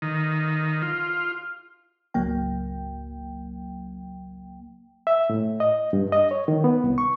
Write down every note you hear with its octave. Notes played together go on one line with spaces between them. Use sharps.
D#3
F4
G#1 C#2 F#3 A#3 G5
E5
A2
D#5
G2
D#5
C#5
D#3
B3
C2
C#6